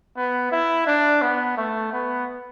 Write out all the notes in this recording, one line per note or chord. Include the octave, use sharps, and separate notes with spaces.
B3
E4
D4
B3
A3
B3